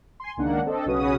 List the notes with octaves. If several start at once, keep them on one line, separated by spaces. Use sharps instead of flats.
G#5 C6
C#2 D#3 A#3 D4 F#5
C4 D4 A4 D#5
B1 C#3 C#4 F#4 B4 D#6